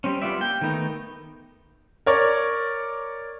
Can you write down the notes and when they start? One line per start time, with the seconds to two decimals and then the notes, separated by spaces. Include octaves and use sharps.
0.04 G3 C4 C#4
0.22 G3 B3 F4 D5 E5
0.40 A#3 G5
0.61 D#3 A3 B3 D#4
2.06 A#4 C#5 D5